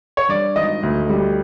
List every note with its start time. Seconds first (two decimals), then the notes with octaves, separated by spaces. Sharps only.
0.17 C#5
0.29 G2 D5
0.56 G#1 D#5
0.83 D2
1.09 G3